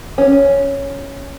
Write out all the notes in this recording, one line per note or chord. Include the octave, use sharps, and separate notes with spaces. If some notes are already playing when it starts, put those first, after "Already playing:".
C#4